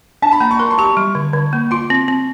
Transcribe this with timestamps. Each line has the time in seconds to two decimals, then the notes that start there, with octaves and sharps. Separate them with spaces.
0.22 D4 A5
0.32 B5
0.40 A#3 A#5
0.51 C#6
0.59 A#4 C6
0.70 C6
0.78 G4 C#6
0.97 G3
1.15 D3
1.33 D3
1.53 A#3
1.71 F4 C6
1.90 C4
2.08 C4